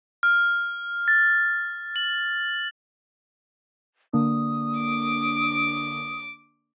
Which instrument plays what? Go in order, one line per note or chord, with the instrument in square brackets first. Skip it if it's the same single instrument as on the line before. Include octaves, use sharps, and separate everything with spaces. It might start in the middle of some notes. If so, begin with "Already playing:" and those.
[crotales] F6
A6
F#7
[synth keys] D3 A#3 D4 [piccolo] D#6
[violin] D6 D7